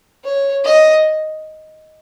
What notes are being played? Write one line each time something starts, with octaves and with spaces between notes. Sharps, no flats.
C#5
D#5